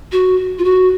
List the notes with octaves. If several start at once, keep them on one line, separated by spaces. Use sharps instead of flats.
F#4
F4
F#4